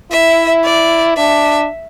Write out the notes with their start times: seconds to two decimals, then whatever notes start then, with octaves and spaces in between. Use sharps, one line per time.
0.11 E4 E5
0.64 D5
1.17 D4 E5